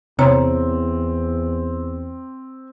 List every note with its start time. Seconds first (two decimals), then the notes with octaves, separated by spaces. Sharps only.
0.19 E2 C3 C4 C#5 A#5